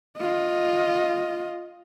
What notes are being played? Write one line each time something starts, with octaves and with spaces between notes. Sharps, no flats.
F4 D#5